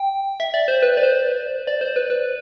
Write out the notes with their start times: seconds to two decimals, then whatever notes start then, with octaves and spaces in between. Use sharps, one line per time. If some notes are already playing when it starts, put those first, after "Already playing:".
Already playing: G5
0.40 E5
0.54 D5
0.68 C5
0.82 B4
0.97 D5
1.03 C5
1.67 D5
1.81 C5
1.96 B4
2.10 B4